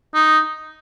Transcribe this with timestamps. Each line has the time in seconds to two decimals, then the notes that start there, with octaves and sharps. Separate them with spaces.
0.14 D#4